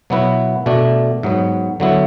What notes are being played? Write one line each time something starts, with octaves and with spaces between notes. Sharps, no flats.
B2 F#3 B3 E4 B4
B2 A3 D4
G#2 F#3 B3
D3 F#3 B3 E4